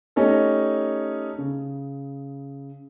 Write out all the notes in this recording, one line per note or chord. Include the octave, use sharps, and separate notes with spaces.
A3 C#4 D#4 G4 A4
C#3